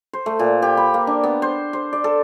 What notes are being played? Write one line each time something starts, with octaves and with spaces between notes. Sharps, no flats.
C5
A3
A#2
G4
B5
A#3
D4
B3
C5
C5
D5
A4